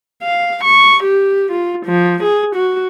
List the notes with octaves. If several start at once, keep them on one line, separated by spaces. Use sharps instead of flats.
F5
C#6
G4
F4
F3
G#4
F#4